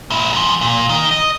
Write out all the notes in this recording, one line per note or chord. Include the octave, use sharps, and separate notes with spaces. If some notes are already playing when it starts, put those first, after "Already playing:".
A#2 E4
F#2 F3
A#2
D#3
D#5